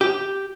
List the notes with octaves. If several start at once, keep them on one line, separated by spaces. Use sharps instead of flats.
G4